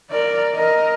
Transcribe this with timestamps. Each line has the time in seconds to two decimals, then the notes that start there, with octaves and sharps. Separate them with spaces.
0.10 A#4 D5
0.55 A#4 D#5